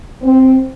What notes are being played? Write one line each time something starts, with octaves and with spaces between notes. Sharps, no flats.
C4